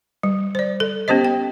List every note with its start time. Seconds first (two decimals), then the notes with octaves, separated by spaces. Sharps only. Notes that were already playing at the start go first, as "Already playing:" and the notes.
0.23 G3
0.55 C5 D5
0.80 A4
1.08 B3 C#4 G4 C5 D#5
1.25 G5